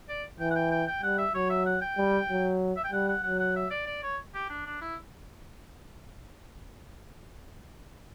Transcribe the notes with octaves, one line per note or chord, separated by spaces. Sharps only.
D5
E3 G5
F#5
G5
G5
G5
G3 F#5
E5
F#3 C#5
E5
F#5
G5
G3
F#3
E5
G5
G3 F#5
F#5
F#3 F#5
F#5
E5
D5
D5
C#5
G4
D4
D4
E4